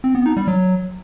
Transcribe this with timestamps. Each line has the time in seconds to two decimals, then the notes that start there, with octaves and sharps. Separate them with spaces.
0.04 C4
0.15 B3
0.26 D#4
0.37 G3
0.48 F#3